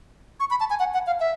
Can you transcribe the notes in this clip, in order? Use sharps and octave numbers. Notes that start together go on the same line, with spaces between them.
C#6
B5
A5
G#5
F#5
F#5
F5
E5